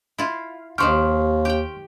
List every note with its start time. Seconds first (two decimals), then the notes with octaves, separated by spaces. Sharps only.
0.18 E4 F4
0.78 D#2 D#3 F3 G4 C6 C#6 F6
1.45 G4 G5